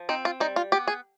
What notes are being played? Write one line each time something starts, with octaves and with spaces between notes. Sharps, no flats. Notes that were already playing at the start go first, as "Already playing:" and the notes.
Already playing: F3
C4 D#4
F4
G3 D#4
F4
B3 G4
G#4